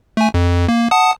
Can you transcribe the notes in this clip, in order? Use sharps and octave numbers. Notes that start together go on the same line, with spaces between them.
A3 G#5
F2
A#3
F#5 A5 D#6